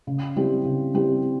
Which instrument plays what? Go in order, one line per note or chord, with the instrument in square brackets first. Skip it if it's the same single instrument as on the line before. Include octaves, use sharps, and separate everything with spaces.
[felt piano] C#3
G3 C4 E4 G4
C#3
G3 C4 E4 G4